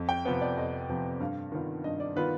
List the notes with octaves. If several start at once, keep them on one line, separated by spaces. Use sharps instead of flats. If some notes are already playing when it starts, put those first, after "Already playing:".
Already playing: F2
G5
C3 F3 B3 B4
D5
F2 D#5
C3 F3 B3
G2 F5
D#3 B3 F4
G2 D#5
D5
D#3 B3 F4 B4